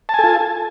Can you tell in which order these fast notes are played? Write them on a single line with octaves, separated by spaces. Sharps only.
A5 G#5 A4 F4